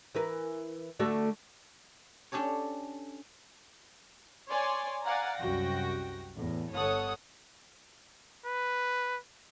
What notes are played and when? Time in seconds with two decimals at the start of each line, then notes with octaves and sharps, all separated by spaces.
0.15 E3 A#4 B4
0.99 D3 A3 F#4
2.32 C#4 D4 G4 A4 C#5
4.50 C#5 D5 G#5 C6
5.04 D5 F5 F#5 G#5 A#5
5.37 C2 F#2 F#4 G5 A#6
6.35 E2 A2
6.73 G1 A4 C#5 F#5 D#6
8.46 B4